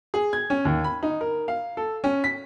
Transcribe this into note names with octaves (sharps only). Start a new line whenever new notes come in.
G#4
G#6
C#4
D#2
B5
D#4
A#4
F5
A4
C#4
B6